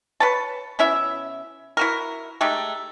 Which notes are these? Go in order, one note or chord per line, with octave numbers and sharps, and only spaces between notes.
B4 C#5 A5
B2 C#4 E4 E5
E4 F#4 A#4
G#3 A3 D#4 G4